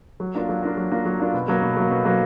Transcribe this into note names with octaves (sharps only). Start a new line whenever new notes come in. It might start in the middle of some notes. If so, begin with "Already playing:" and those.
F#3
A#3 D4 F4
F#3
A#3 D4 F4
F#3
A#3 D4 F4
F#3
A#3 D4 F4
B2
F#3 A#3
B2
F#3 A#3
B2
F#3 A#3